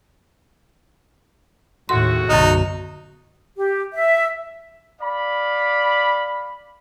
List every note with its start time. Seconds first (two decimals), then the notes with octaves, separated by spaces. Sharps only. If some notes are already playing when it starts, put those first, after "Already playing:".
1.89 D#2 A2 G#3 A3 F#4 C6
2.29 B1 F#2 D3 D#4
3.56 G4
3.94 E5
5.02 D5 F5 B5